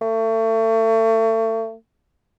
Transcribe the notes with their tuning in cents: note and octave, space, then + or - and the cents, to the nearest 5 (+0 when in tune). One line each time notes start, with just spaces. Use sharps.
A3 +35